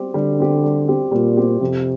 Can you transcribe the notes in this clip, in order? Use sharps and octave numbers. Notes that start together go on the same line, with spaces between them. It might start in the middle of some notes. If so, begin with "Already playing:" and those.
Already playing: G3 C4 G4
D3 G3
C4 G4
G3
C4 G4
A#2 G3
C4 G4
F2 C3